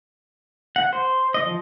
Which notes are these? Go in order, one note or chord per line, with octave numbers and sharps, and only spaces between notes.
F#5
C5
D#5
F3